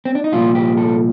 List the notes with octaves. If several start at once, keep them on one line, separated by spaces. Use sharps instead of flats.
C4
D4
D#4
C2 A#2 F3 F4
G4
A4